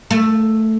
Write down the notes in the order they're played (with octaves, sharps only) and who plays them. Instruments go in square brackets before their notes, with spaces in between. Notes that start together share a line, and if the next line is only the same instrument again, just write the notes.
[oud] A3